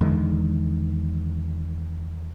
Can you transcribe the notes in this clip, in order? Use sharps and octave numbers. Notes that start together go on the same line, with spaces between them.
E2 D3 D#3 G#3